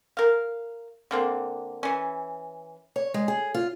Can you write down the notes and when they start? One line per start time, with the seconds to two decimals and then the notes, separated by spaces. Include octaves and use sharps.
0.17 A#4 F5
1.11 D3 A#3 C4
1.83 E3 C#4
2.96 C#5
3.14 G#3
3.28 G#4
3.54 F4